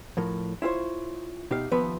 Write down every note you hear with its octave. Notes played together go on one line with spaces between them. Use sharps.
A2 F3 A#4
E4 F4 G#4 C5 C#5
B2 D#4 G4 E5 F5
D#2 F3 B3 B4 E5 B5